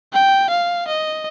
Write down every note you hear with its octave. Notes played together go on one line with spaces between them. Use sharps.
G5
F5
D#5